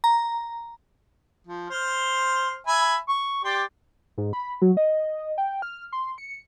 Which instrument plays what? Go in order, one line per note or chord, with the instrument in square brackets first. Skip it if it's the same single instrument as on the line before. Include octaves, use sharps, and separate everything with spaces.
[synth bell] A#5
[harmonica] F3
C5 C6 F6
E5 G#5 B5
C#6
G4 D5 C6
[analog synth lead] G#2
B5
F#3
D#5
G5
F6
C6
C#7